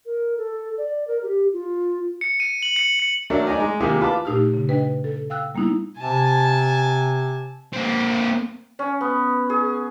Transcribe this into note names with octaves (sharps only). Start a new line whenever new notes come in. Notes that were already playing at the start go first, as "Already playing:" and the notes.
A#4
A4
D5
A#4
G4
F4
C#7
D#7
F#7
C#7
C#7
F#3 A3 D4 A#4
D#4 D5 G#5 A#5
G#3
C3 D#3 A#3 F4 G4 G#4
F4 B4 A5 D6
A#2 A3 D#4 G4 E6 F6
C#3
D4 B4 D#5 G5
A4
F5 G5 E6 F#6
G3 A#3 B3 D#4 E4
C3 G#5 A5
A#3 C4
C#4
B3
G#4